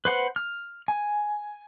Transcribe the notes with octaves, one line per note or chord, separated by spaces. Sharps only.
B4 C5 F#5
F6
G#5